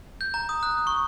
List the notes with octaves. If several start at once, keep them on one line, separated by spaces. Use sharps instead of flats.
G6
A#5
D#6
F#6
C#6